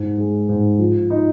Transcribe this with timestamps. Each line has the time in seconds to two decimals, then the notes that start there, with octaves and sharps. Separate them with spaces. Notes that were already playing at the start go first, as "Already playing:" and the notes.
Already playing: G#2
0.18 G#3
0.49 G#2
0.79 F3
1.10 D#4